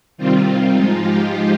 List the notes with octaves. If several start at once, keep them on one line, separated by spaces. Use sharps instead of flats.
C3 D#3 G3 C4 F4
G#2 F3 G#3 D#4 F4
G4